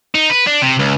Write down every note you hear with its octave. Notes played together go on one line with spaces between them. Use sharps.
D#4
B4
D4
C3
C#2